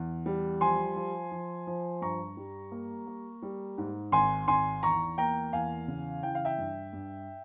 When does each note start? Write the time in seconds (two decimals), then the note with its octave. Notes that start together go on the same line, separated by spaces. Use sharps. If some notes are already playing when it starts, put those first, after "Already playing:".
Already playing: E2
0.26 G3
0.61 F3 G#5 C6
0.96 F3
1.32 F3
1.67 F3
2.01 G2 A#5 C#6
2.37 G3
2.71 A#3
3.07 A#3
3.42 G3
3.78 G#2
4.12 G#1 G#5 C6
4.48 G#1 G#5 C6
4.83 E2 A#5 C#6
5.18 A#3 G5 A#5
5.53 E2 F5 G#5
5.88 C#3
6.23 E3 G5
6.35 F5
6.45 E5 G5
6.58 G2
6.93 G2